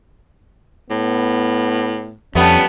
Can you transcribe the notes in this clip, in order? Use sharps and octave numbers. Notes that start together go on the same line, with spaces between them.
A2 B3
F2 G3 A3 B3 C#4